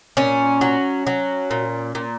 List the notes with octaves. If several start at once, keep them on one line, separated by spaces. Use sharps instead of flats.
A#2 C#4
F#3
F#3
A#2
A#2